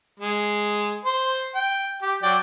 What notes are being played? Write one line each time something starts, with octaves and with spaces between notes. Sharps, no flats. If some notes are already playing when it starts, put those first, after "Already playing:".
G#3
C5
G5
G4
F#3 D5 G5